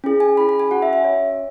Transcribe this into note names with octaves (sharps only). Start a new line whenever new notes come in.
C#4 E4 G#4
G#5
C#4 E4 G#4 B5
B5
G#5
C#4 F#4 F#5
E5
E5
C#4 F#4 C#5